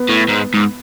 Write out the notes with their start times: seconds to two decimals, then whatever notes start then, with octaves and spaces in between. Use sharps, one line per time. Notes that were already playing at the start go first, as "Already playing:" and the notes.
Already playing: B3
0.09 A2
0.28 G#2
0.54 G#2